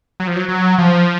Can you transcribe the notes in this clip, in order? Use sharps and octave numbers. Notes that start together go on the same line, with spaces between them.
F#3
F3
F#3
F#3
F3